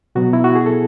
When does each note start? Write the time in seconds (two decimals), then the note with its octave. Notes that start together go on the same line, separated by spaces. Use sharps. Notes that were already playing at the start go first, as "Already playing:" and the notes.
0.15 B2 F#3 B3 F#4
0.33 E4
0.44 F#4
0.55 G#4
0.66 A4